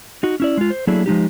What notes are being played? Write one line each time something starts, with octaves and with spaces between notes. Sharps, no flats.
D#4 F#4
C#4 E4 D5
G#3 F4
C5
F#3 A3 A#3 D4 E4 G#4
F3 G#3 D#4 G4